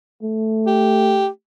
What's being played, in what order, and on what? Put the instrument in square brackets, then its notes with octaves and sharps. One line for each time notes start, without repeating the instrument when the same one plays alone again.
[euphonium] A3
[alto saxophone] G4